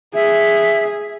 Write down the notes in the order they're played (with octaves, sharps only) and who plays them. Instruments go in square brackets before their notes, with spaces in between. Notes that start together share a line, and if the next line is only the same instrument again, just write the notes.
[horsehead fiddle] G#4 [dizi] E5